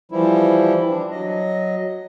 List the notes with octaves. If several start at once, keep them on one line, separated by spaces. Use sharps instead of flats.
E3 F3 G3 E4
D4
F#3 D#5